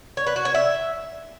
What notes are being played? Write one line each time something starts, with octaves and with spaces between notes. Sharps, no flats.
C#5
B4
F#4
C#5
E5